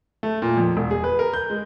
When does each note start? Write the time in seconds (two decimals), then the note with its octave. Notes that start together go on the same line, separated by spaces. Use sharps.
0.23 A3
0.42 A#2
0.57 F2
0.77 E1
0.91 G#4
1.04 B4
1.19 A#4
1.34 G6
1.50 G#3